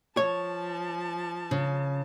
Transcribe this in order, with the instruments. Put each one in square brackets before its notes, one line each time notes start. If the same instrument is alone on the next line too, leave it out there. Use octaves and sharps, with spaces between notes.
[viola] F3 A5 [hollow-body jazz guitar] C#5
[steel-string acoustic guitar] C#3